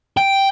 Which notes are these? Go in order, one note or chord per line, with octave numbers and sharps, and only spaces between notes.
G5